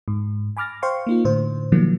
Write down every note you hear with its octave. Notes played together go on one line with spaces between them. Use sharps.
G#2
G#5 B5 D6 F6 A6 A#6
C5 F5 G5 C6 C#6
A#3 D#4 F4
A2 D3 C5
B2 D#3 F3 F#3 A#3